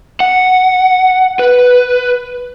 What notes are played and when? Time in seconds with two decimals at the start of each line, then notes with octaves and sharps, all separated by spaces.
0.20 F#5
1.39 B4